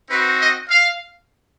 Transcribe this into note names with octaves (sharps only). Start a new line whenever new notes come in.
C4 D#4 F#4 B4
D#5
F5